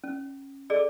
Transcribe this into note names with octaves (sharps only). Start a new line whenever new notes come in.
C#4
G#4 A4 D5 D#5